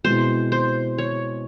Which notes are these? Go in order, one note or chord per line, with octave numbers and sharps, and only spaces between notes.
B2 G#3 C4 E4 C5
C5
C#5